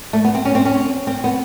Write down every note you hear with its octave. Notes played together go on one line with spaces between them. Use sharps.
A3
B3
C4
C#4
C4
C#4
C4
B3